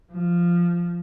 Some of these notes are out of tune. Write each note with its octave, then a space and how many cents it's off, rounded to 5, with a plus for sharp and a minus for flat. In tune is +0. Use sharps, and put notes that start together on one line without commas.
F3 -10